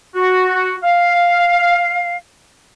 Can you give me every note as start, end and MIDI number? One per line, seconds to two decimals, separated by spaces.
0.15 0.76 66
0.83 2.17 77